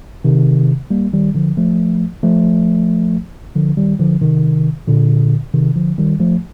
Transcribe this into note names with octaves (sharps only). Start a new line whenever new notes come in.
C3 D#3
G3 A#3
D#3 G3
D3 F3
F3 A3
F3 A3
D3 F3
D#3 G3
D3 F3
C3 D#3
A#2 D3
C3 D#3
D3 F3
D#3 G3
F3 A3